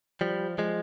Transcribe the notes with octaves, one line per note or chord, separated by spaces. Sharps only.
F3 G3
F3 G#3